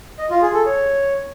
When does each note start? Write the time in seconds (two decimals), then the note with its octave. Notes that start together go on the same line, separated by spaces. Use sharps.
0.18 D#5
0.30 F4
0.42 G#4
0.54 A4
0.66 C#5